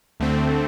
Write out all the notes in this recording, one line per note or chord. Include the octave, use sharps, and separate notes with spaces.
D2 D3 A3 C4